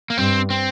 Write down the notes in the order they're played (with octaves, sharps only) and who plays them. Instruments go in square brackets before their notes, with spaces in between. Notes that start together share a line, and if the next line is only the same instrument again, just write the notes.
[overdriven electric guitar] A#3
[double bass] G2 [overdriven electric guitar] C4
[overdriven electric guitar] C4